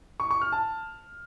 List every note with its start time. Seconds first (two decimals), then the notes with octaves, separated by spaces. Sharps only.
0.20 C#6
0.31 C#6
0.41 F6
0.52 A5